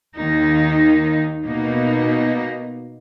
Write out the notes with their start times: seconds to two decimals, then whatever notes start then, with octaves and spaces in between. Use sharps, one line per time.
0.17 D#2 D#3 A#3 D#4
1.44 B2 A#3 D#4